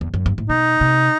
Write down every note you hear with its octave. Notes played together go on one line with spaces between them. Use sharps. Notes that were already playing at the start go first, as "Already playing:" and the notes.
E2
F#2
G2
A2
B2 D#4
C3